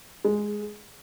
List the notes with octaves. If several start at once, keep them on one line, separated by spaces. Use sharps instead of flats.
G#3